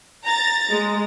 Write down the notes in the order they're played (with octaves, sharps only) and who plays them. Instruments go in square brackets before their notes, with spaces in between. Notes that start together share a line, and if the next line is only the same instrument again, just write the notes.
[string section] A#5 A6
[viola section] G#3